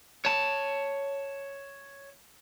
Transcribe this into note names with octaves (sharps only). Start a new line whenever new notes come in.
C#5 A5